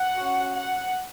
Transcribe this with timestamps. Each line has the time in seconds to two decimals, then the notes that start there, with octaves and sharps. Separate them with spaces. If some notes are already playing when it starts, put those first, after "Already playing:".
Already playing: F#5
0.18 C#4 F#4
0.54 F#5